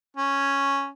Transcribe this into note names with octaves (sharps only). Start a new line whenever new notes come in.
C#4